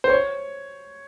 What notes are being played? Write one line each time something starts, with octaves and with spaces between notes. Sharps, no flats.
C5
C#5